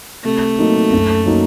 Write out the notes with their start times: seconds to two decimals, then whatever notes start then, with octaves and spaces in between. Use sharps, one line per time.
0.24 C3 A3
0.59 F#3 A#3 D#4
0.93 F#2
1.26 F#3 A#3 D#4